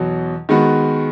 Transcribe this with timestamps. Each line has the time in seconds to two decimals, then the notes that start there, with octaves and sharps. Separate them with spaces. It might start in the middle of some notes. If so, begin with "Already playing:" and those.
Already playing: E2 B2 F#3
0.49 D#3 G#3 B3 F#4